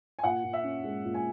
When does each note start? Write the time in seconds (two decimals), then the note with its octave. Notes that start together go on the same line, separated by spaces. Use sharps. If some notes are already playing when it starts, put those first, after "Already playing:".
0.19 G#5
0.24 A#2 F#5
0.44 A#2
0.53 E5
0.64 C#4
0.84 G#3
1.05 A#2
1.14 G#5